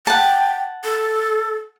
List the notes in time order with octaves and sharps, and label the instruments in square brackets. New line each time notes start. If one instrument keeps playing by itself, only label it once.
[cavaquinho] F#5 A5 [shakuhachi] G5
[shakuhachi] A4